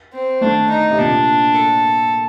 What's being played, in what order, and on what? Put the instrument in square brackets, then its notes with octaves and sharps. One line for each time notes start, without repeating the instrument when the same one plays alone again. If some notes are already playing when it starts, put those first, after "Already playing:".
[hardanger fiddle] C4
[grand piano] A3 [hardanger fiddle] D4
[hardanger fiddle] D#4
[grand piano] C3
[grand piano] A#2 [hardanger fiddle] D4
[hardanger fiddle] A4